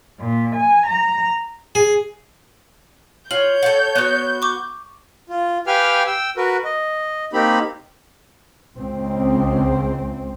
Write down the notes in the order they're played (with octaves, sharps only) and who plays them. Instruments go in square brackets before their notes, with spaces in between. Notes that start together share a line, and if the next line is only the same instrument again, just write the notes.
[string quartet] A#2
G#5
A#5
[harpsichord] G#4
[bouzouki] F4 [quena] C#5 [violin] G6 [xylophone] F#7
[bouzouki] A4 F#5
B3 F#4
[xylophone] C#6 D6
[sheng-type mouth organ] F4
G4 B4 F5 G5 G#5 F6
G5 E6
F#4 A#4 B4
D#5
A#3 C4 D#4 G4 B5
[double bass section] C#2 C4